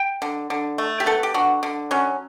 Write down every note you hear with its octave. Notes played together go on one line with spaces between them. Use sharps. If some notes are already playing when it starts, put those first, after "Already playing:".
Already playing: G5
D3
D3
A3
G4
B3 A4
G4
D3 F#4
D3
F#3 C#4